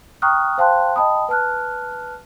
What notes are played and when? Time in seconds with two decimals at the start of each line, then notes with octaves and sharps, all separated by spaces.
0.22 G5 A#5 C#6 D#6 F6 F#6
0.58 C5 F5 G5 A5 C6 F#6
0.96 D#5 G5 A5 B5 D#6
1.29 B4 A5 F6 F#6